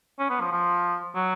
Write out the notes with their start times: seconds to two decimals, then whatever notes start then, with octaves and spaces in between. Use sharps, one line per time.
0.19 C#4
0.30 B3
0.40 F3
0.51 F3
1.16 F#3